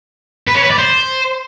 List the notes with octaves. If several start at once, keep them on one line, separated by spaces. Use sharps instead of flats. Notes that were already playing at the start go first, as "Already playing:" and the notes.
B4
C#4
B4
D5
C5